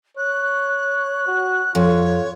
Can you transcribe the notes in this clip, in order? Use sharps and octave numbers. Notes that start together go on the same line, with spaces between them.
C#5 F#6
F#4
F2 F4 C#5